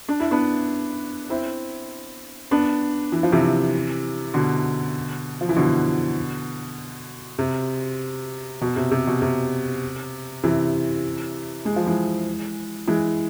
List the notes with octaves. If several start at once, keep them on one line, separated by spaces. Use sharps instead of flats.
D4
E4
B3 D4
C4 E4
B3 D4
E3
F3
C3 E3
B2 D3
F3
E3
B2 D3
C3
B2
C3
C3
B2
C3
C3 E3
G#3
F3
E3 G#3
E3 G#3